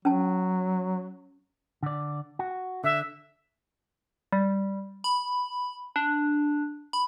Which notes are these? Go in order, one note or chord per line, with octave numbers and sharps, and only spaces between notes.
F#3 C#4 A5
D3 D5
F#4
D3 E5
G3
B5
D4
B5